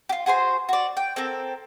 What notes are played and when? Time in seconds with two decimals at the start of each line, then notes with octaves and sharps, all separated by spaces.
0.09 F4 G4
0.26 F#4 G#4 C5 C6
0.69 F#4 D5
0.97 G5
1.16 C4 A4 A#4